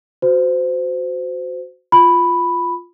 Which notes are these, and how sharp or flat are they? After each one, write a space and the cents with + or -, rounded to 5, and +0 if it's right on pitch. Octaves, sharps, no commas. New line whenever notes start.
F#4 -10 C5 -25
F4 +0 B5 +0